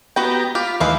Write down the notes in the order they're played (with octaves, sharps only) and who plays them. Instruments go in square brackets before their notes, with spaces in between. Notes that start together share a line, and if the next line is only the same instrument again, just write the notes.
[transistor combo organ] B3 G4 A#5 [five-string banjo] F#4 B4 G5
[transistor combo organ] F4 B5 [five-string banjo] G4
[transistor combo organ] D#2 E3 [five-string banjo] G#3 B4 F5